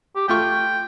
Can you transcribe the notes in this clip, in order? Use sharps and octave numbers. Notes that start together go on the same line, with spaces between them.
G4
A3 F4 G5 C#6